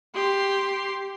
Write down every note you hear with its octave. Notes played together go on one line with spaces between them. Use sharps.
G4 C6